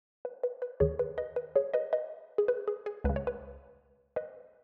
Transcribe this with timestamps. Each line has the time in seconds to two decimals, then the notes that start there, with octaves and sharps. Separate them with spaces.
0.25 B4
0.43 B4
0.62 B4
0.80 D#2 D#3 G#4 C#5
0.99 B4
1.18 B4 D#5
1.36 B4
1.56 G#4 C#5
1.74 B4 D#5
1.93 B4 D#5
2.38 G#4
2.48 B4
2.68 G#4
2.86 G#4
3.04 C#2 C#3 B4
3.16 C#5
3.27 B4
4.16 B4 D#5